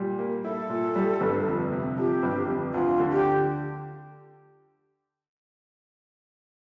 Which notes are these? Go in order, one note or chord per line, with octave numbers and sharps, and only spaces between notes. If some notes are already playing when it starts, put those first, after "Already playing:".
Already playing: A#2 G3
A#3
E4 A4
A#2
G3
G1
F2
C3
F3 G4
G1
F2
D2 F4
D3
G4